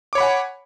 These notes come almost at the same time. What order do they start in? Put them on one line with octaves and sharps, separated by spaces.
D6 C#5 B5 F#5 G#5